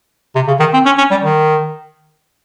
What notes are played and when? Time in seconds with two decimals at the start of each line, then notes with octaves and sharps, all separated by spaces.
0.35 C3
0.47 C#3
0.59 D#3
0.73 C4
0.85 C#4
0.98 C#4
1.11 G3
1.23 D#3